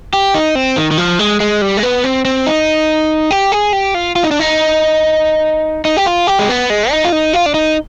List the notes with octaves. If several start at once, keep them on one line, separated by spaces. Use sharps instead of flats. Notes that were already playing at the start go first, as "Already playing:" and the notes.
G4
D#4
C4
D#3
D#3
F3
G#3
G#3
G3
G#3
B3
C4
C4
D#4
G4
G#4
G4
F4
F4
D#4
D4
D#4
D#4
G4
F4
G4
G#3
B3
G#3
D#4
F4
D#4
F4
D4
D#4